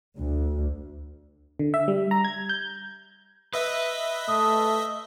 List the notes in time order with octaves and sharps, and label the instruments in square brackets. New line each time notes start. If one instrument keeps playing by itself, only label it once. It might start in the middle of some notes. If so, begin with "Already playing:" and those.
[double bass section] D2
[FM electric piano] D3
E5
G3
A#5
G#6
G6
[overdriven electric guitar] B4 [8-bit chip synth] D#5 E5
[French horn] A3 [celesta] D#6